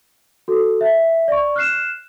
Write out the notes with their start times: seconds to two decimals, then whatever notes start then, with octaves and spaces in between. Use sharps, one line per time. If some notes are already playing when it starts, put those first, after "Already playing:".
0.48 F#4 A4
0.81 E5
1.28 D5 C#6
1.56 F6 F#6 C7 E7